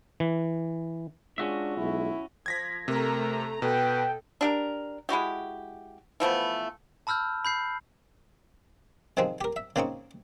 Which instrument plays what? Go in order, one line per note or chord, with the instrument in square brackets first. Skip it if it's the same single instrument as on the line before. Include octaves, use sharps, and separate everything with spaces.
[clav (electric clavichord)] E3
[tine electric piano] G#3 F4 G#4 [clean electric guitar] C#4 F#4 E5 [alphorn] D4
[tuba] B1 [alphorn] E4
[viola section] F3 [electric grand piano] G#6 A#6 B6
[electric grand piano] C3 [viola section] A3 A#5 [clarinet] A#4
[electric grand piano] B2 [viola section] A4 [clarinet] B4 [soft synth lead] G5
[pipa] D4 G4 A#4
G#3 E4 F#4 G4
E3 F3 A3 B3
[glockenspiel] A5 B5 E6 F6 G6
B5 G6 C7
[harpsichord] C3 D#3 F3 G#3 C4
G4 A#4
E5
C#3 A#3 C4 D#4 C#6